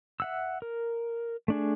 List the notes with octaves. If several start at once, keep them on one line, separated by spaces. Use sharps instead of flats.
E5 F#5 E6
A#4
A3 D4 G#4